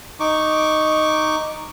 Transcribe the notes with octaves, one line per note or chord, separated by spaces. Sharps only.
D#4 C#6 D6